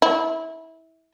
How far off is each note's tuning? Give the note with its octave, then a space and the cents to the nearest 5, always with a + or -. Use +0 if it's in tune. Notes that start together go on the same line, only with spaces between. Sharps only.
E4 -25